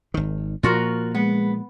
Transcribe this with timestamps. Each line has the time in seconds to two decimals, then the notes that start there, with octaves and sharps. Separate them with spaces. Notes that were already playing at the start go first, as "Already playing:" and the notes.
0.14 G#1 D#3
0.63 A#2 F3 A#3 F4 F#4 A#4
1.15 G#3 B3